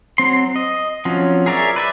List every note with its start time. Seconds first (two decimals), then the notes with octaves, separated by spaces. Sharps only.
0.18 F#3 C4 C6
0.56 D#5
1.05 F3 F#3 C4 C#4
1.46 G#4 A#4 C#5 D5 E5
1.76 B4 D5 E5